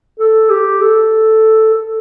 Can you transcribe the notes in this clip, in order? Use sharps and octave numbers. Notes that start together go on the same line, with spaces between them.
A4
G4
A4
A4